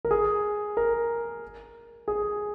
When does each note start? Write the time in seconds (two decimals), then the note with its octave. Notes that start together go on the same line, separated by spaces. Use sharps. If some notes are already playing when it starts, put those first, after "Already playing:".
0.05 A#4
0.11 G#4
0.77 A#4
2.08 G#4